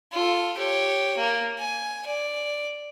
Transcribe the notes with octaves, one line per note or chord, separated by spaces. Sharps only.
F4 A4
G4 C#5
A#3
G#5
D5